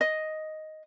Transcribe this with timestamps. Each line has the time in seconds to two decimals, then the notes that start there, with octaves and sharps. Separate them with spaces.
0.01 D#5